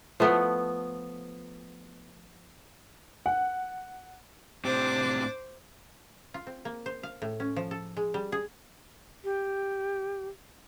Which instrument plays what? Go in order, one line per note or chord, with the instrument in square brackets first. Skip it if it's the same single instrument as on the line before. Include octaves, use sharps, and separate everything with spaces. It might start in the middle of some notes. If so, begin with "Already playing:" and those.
[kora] F3 A3 B3
[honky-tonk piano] F#5
[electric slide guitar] A2 C4 G4 [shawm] D4 [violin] C5 D6
[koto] F4
C4
A#3
C5
F5
A2
C#4
F3
A4
G#3
G3
G#4
[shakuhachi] G4